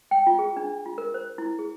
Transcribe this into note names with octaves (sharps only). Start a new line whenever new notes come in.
G5
F4
G#4
D4
F4
A#4
C5
E4
G#4